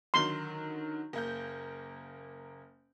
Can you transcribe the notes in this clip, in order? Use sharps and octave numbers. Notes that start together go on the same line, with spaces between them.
D3 D#3 F#3 C6
F#1 A#3 G6